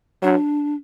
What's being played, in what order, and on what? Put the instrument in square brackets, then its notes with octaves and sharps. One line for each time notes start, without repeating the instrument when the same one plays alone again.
[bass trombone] F#3 [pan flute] D4